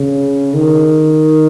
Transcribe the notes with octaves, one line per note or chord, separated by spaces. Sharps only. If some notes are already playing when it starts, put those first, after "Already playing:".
Already playing: C#3
D#3